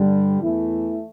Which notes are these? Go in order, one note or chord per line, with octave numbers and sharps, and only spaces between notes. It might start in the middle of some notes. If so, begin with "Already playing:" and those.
Already playing: G2 D3 G3
E2 E3 A3 E4